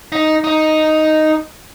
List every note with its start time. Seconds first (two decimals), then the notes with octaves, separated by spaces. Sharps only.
0.12 D#4
0.44 D#4